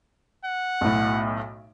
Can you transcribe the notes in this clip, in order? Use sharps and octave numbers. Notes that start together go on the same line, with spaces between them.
F#5
B1 A2